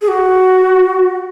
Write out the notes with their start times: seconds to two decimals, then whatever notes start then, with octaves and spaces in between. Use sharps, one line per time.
0.02 G#4
0.08 F#4